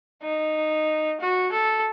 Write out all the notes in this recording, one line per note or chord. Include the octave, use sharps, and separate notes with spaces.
D#4
F#4
A4